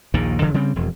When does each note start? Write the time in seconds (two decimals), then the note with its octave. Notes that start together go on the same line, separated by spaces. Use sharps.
0.14 A#1 D#2 A#2 D#3
0.41 E1 D3 F3
0.54 C#3 G3 C4
0.76 E1 F2